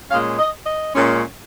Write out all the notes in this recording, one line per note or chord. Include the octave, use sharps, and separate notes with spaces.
A#2 G#3 C#4 F5
D#5
D#5
A#2 G#3 C#4